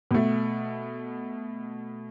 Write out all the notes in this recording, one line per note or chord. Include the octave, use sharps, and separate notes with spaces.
B2 A3